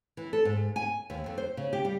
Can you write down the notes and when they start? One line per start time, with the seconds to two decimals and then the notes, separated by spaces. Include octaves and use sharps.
0.17 E3
0.33 A4
0.45 G#2
0.76 G#5
1.10 D#2
1.26 F2
1.38 C5
1.57 C#3
1.73 G4
1.85 G3